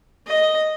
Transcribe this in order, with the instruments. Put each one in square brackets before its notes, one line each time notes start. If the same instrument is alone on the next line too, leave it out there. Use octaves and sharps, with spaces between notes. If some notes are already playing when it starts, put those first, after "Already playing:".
[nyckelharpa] D#5